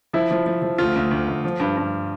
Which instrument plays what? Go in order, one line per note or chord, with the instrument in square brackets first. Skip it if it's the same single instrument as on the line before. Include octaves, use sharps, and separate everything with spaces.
[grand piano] F3 E4
F3
F3
F3
D2 F4
D2
D2
D2
F3
G2
G2